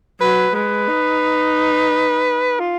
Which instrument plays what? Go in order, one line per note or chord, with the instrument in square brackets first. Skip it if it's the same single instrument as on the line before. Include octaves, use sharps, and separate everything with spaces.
[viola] F#3 [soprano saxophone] B4
[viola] G#3 [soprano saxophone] B4
[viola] D#4
[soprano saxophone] F4